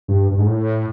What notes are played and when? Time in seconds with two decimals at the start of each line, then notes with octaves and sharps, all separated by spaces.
0.08 G2
0.31 G2
0.39 G#2
0.46 A2